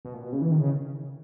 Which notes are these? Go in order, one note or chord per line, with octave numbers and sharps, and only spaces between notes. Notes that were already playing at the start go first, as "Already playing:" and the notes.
B2
A#2
B2
C#3
E3
D#3
C#3